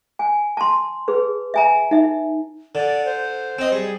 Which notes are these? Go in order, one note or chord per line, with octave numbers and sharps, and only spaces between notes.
G#5
A5 C6
G#4 B4
E5 G#5 A#5
D#4 E5
D3 D5
C5
C4 D#5
G3 G#4